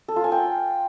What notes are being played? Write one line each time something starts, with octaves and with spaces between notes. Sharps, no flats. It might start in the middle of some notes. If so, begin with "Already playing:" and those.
A4
F4
G#5
G5